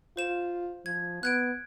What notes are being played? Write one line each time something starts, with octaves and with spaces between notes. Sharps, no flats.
F4 C5 E7
F3 G#6
B3 F#6 G#6 D7